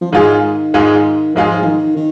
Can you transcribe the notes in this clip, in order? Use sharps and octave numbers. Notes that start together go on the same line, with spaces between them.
F3
G#2 D#3 G#3 F4 G#4
G#2 G#3 F4 G#4
G#2 F3 G#3 F4 G#4
F3
D#3
D#3